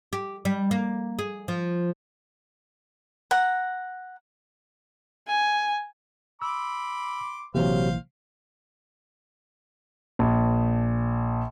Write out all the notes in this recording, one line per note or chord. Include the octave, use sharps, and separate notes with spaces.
G4
G3
A#3
G#4
F3
F#5 A#5
G#5
B5 C6 D6 E6
A#1 C3 E3 F#3 A#3 C5 F5
A#1